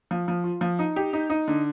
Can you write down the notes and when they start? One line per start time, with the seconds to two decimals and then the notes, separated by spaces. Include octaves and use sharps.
0.11 F3
0.28 F3
0.44 F4
0.61 F3
0.79 D#4
0.96 G4
1.13 D#4
1.30 D#4
1.48 D3